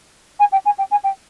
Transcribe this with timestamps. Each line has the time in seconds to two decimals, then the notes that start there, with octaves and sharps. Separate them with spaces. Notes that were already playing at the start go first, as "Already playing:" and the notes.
0.39 G#5
0.52 G5
0.65 G#5
0.78 G5
0.91 G#5
1.04 G5